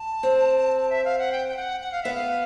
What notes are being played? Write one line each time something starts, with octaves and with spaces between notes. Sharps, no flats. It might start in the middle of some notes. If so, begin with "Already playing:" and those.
Already playing: A5
C4
E5
F5
F#5
G5
G5
F#5
F#5
F5
B3 E5
F5